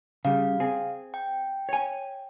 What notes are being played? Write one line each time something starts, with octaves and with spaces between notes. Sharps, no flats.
C#3 G3 F5
C4 G#4
G5
C#5 G#5